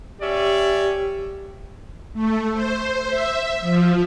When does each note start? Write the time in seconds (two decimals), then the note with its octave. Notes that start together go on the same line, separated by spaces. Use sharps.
0.21 C#4 G4 D5 E5
2.14 A3
2.52 C5
3.08 E5
3.61 F3